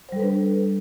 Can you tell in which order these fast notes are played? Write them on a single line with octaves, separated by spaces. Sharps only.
C5 G3 A4 B4 D4